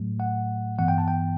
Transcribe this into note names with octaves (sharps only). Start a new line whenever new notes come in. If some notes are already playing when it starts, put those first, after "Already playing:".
Already playing: A2 F#3 A3
F#5
G2 E3 B3 F#5
G5
A5
G5